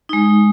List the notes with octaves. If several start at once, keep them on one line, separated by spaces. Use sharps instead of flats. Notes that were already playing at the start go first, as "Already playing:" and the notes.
G#3 D#4